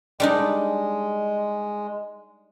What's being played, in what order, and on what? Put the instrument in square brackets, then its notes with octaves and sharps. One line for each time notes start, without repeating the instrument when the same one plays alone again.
[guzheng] G3 D4 D#4 [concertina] G#3